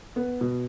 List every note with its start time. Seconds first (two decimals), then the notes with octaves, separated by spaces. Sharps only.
0.16 B3
0.41 B2